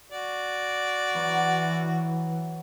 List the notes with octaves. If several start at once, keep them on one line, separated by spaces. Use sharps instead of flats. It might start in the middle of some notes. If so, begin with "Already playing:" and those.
F#4 D5
E3 F#3 B3